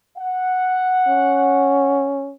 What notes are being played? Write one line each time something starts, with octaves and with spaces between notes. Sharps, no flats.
F#5
C#4